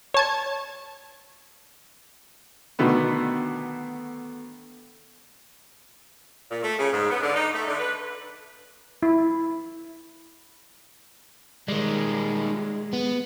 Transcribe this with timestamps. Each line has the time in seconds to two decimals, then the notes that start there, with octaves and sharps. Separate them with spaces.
0.14 C#5 A5 G#6
2.79 B2 D3 D#3 A3 B3
6.51 A#2
6.63 A3
6.79 C#3
6.93 G#2
7.11 B3
7.22 D3
7.35 D#4
7.54 A3
7.68 D3
7.79 B4
9.03 E4
11.68 D#3 G3 G#3
12.93 B3